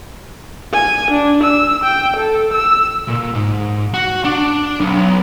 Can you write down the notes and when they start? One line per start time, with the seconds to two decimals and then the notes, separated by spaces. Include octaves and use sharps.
0.73 G#5
1.11 D4
1.43 E6
1.84 G5
2.17 A4
2.53 E6
3.08 A#2
3.35 G#2
3.94 F#4
4.25 D4
4.81 B1